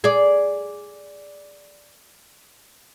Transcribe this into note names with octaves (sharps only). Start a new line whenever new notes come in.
G#4 D5